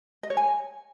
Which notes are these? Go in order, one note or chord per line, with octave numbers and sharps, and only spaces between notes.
D#5
C#5
G#5